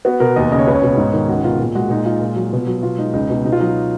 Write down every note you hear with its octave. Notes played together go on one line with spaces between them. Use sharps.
B3 F#4
B2 A#4
D#2 D#5
C#3 D#5
C#5
C#2 B4
C#5
B2
G#2
D#3
C#2 F#4
B2 F4
A#2
G#3 F#4
A#2 D#4
G#3 F4
A#2
F#3
B2
F#3
B2 F4
G#3 D#4
C#2 D#4
B2 D#4
B2 D#4
F4
F#3 D#4